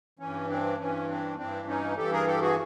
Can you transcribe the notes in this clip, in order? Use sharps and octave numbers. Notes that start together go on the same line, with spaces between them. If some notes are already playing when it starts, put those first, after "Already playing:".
G2 E3 C#4
C4 D4
G2 E3 C#4
C4 D4
G2 E3 C4 D4
C#4 D#4
G2 E3 G4 A4
G#4 A#4
G4 A4
F#4 G#4